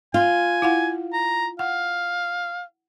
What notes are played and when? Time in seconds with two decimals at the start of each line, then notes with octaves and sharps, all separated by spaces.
0.14 F4 G#5
0.62 E4 F5 F#5
1.13 A#5
1.59 F5 F#5